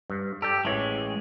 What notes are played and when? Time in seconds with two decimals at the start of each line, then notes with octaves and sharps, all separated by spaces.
0.10 G2
0.42 G4 A4 D5 G5
0.65 A1 E3 G#3 C#5